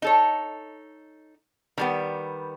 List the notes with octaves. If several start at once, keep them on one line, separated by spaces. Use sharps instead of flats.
D#4 A4 C#5
D#3 G3 B3